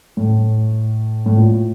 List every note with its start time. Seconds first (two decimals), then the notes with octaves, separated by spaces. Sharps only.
0.17 A2
1.26 A2
1.36 A#2